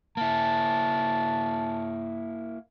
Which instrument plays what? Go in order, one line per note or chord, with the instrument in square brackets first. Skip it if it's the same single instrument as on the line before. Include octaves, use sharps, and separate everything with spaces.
[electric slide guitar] A#3 E4 [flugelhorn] A5